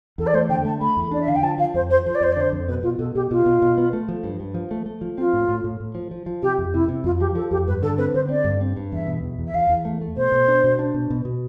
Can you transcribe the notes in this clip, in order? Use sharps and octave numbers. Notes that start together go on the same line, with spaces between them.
E2 A4
D5
A3 C5
D3 G5
A3 A5
A3 B5
E2
D4 D5
E5
D3 F5
G5
F3 A5
F3 F5
F2 C5
F3 C5
F3 C5
D5
F2 C5
D5
D3 C5
F2
B2 B4
B2 F4
B2 A4
B2 G4
B2 F4
B2
B2
B3
A3
F3
G2
G2
F3
A3
A3
F3
C4 F4
A2
A2
A2
A2
F3
F3
F3
C3 G4
F2
C3 E4
C3
F2 F4
F3 G4
F3 A4
F2 G4
G2 B4
D3 A4
C4 B4
D3 C5
C4 D5
G2
C4
G2
E2 E5
B2
E2
E2
E5
E2 F5
E2
A3
A3
B2 C5
B2
D4
B2
D4
B2
B2
B2